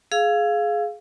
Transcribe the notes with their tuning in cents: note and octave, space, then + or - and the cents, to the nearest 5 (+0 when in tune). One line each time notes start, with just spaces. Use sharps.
G#4 +15 F5 +0 E6 +25